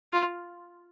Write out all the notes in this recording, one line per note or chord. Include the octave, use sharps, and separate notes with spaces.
F4